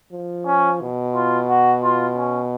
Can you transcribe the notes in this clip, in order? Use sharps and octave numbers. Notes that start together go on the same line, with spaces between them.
F3
C#4
B2
F4
F#4
F4
C#4